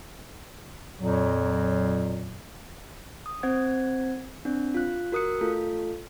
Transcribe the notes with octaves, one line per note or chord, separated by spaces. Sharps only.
F2 A#2 F#3
D#6
C4 C5 F#5 G#6
C4 D4
F4 F#6
F#4 A#4 D#6 F#6 C#7
A3 F4 A4